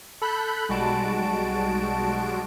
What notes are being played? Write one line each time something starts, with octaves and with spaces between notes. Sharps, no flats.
A4 B5 F#6 G6
B1 G3 G#3 F#4 A5 D7